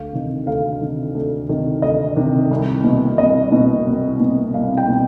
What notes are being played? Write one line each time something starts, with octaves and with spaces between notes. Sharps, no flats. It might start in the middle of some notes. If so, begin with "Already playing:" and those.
Already playing: D2 F5
C3 D#3
D2 F5
C3 D#3
D2
C3 D#3
D2 D#5
C3 D#3
C2
B2
C2 D#5
B2
C2
B2
C2 F5
G5
B2